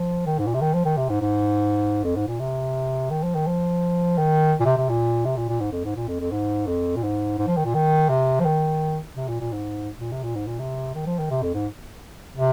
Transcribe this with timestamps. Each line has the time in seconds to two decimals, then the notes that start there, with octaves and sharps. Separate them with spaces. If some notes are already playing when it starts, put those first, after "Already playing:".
Already playing: F3
0.26 D#3
0.39 G#2
0.47 A#2
0.54 C3
0.61 D#3
0.74 F3
0.85 D#3
0.97 C3
1.09 G#2
1.21 G#2
2.04 F2
2.16 G#2
2.28 A#2
2.40 C3
3.10 D#3
3.23 F3
3.35 D#3
3.47 F3
4.18 D#3
4.60 A#2
4.65 C3
4.77 C3
4.89 A#2
5.25 C3
5.37 A#2
5.49 A#2
5.60 G#2
5.72 F2
5.84 G#2
5.96 A#2
6.08 F2
6.20 F2
6.32 G#2
6.67 F2
6.96 A#2
7.03 G#2
7.38 G#2
7.47 F3
7.57 D#3
7.65 A#2
7.74 D#3
8.09 C3
8.40 F3
8.45 D#3
9.16 C3
9.28 A#2
9.41 A#2
9.52 G#2
10.00 A#2
10.12 C3
10.23 A#2
10.35 G#2
10.47 A#2
10.59 C3
10.94 D#3
11.06 F3
11.19 D#3
11.31 C3
11.43 F2
11.54 G#2
12.37 C3